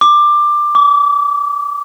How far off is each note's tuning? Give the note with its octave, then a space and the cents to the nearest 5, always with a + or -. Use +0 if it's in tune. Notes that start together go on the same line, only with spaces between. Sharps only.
D6 +15
D6 -30